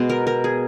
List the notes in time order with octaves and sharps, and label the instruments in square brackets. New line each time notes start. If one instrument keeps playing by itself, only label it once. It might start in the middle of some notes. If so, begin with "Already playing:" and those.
Already playing: [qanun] B2 G#3 B3
A#4
A#4
G#4